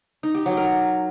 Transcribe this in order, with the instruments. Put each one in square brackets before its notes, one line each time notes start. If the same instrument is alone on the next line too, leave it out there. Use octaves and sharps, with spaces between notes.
[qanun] D#4
G4
F#3
A#4